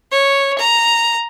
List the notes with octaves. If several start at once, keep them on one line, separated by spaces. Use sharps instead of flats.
C#5
A#5